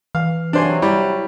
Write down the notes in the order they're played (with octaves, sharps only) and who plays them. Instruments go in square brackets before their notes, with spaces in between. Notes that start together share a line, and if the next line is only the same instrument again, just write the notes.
[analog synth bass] E3 [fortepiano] F5
[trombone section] C3 F#3 [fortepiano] D4 C5 G#5
[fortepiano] G3 [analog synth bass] E4